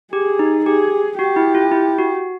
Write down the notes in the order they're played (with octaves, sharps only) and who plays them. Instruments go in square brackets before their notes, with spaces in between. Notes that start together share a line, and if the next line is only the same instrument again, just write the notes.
[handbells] G4 [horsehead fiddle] G#4
[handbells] D#4
[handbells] G4 [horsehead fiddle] G#4
[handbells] F#4 [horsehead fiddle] G4
[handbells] E4
F4
E4
F#4